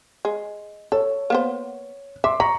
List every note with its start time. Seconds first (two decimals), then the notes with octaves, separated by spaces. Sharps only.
0.25 G#3
0.92 A4 C#5
1.30 A#3 B3 C5
2.24 E5 C6 D6
2.40 A#5 B5 C#6